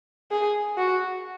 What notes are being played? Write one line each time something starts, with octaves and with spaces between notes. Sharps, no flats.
G#4
F#4